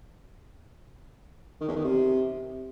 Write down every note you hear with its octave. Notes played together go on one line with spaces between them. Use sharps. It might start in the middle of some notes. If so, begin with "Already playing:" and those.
D#3
E2
D#3
C3